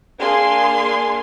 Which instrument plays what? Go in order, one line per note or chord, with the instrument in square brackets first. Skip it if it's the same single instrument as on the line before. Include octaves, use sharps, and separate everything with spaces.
[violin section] A#3 D4 G#4 F5 G#5 C6